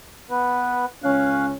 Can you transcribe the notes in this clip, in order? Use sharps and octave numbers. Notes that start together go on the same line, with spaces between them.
B3 B4
C#2 C#4 F5 F#6